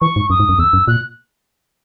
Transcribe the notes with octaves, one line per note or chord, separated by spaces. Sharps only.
E3 C#6
G#2
F#2 D#6
G#2
F#2
E2 E6
F#2
A#2 F#6